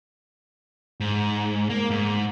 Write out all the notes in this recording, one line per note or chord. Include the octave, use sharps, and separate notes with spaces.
G#2
A#3
G#2